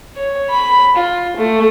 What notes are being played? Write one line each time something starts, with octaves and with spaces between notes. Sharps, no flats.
C#5
B5
F4
A3